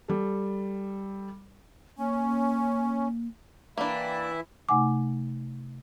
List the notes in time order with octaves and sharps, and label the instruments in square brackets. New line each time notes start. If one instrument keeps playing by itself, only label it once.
[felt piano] G3 A4
[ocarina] A#3 [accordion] C#4
[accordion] E3 E4 E5 [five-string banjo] A#3 D4 [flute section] D5 G5 B5
[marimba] C3 A3 D#4 F#5 G#5 D6